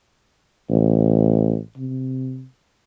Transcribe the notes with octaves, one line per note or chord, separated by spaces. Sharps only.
A1
C3